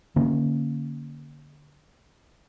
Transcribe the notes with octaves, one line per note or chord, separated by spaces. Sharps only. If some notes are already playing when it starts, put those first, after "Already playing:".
D3 A#3 C#4